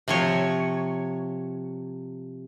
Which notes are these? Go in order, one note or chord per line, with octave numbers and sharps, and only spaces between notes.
C3 F3 C#5